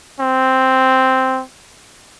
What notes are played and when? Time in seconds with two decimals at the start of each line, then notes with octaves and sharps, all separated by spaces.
0.20 C4